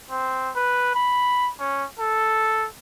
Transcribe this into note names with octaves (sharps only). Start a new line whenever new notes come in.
C4
B4
B5
C#4
A4